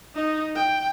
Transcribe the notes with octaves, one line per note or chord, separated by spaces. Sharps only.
D#4
G5